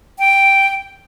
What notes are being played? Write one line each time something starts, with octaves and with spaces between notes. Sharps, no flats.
G5